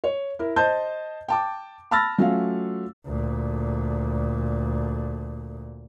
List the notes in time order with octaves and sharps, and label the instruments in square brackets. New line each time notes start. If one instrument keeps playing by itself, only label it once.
[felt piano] C#5
E4 A#4
C5 D#5 A5 G6
G5 A5 D6
A5 B5 E6 F6 A6 A#6
F#3 A3 C#4 F4 F5
[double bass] D2 A#2